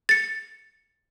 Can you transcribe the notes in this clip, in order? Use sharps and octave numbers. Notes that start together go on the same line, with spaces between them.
A6 C#7